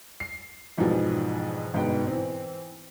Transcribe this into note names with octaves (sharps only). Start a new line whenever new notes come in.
C7
F2 G#2 B2 E3 F3 G3
G1 G#2 B2 B3 G5
E3 C4